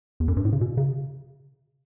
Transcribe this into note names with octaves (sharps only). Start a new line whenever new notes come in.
E2
F#2
G2
A2
C#3
B2
C#3